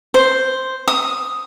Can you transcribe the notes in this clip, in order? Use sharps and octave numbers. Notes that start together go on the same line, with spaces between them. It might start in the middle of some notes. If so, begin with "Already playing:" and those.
C5
D#6